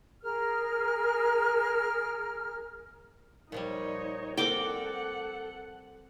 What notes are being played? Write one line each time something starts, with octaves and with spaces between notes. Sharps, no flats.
G#4 A#4 F6
A#2 F3 G3 D#4 C#5
C4 A4 A#4 D5 F#5 G5 D6